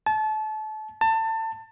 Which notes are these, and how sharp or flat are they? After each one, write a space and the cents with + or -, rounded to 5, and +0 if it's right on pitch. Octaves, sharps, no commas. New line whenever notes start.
A5 -30
A5 +25